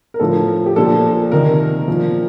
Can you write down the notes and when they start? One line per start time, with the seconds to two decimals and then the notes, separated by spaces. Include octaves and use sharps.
0.14 A#4
0.20 A2 F3 A4
0.66 G4
0.76 A#2 F3 A4
1.32 C3 D#3 A#4
1.88 A#2 F3